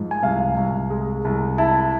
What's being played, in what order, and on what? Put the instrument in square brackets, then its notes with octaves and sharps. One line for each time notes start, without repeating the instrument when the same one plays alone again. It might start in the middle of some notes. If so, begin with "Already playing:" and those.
Already playing: [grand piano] G#2 F3
G#5
C2 F5
C2
G#3
C2
E4 A5